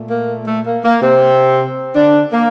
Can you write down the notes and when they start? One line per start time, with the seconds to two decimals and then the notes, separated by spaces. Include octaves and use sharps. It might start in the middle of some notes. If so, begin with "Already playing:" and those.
Already playing: A#2 A3
0.10 A#3
0.47 A3
0.66 A#3
0.85 A#3
1.02 C3 C4
1.96 D3 D4
2.33 A#3